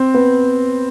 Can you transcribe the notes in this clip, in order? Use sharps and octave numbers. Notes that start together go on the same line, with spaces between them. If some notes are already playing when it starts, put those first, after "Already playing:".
Already playing: C4
B3